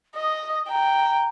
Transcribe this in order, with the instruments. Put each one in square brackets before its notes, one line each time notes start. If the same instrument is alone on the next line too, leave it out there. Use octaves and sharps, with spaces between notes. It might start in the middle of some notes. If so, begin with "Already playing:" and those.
[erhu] D#5 [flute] D#6
[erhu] G5 [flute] A#5